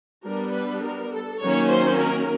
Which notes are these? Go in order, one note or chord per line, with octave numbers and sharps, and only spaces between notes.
G3 B3 D4 A#4
B4
A#4
A4
D#3 F#3 A#3 C#4 C#5
C5
A#4